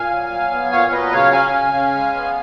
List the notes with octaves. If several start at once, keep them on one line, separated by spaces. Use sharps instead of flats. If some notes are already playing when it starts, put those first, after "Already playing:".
Already playing: A#2 F5 G#5
F#3
F#3
B3
A#2 C#5 F5
F#3 B4 D#5
C#3 C#5 F5
C#4 F5 G#5
C#3
C#4
G#3
B3